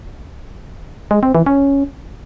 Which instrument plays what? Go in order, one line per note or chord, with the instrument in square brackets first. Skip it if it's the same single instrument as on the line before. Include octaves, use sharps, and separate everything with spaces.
[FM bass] G#3
C4
E3
C#4